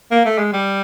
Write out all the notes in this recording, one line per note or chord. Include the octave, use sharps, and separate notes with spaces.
A#3
A3
G#3
G3